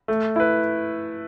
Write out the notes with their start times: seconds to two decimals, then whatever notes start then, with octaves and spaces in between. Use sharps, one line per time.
0.08 A3
0.36 E4 B4